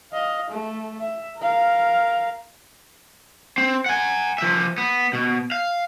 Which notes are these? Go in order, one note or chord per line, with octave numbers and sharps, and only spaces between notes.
D#5 F5
A3
E5
A#4 F5
C4
F#5 G#5
F3 E5
B3
B2
F5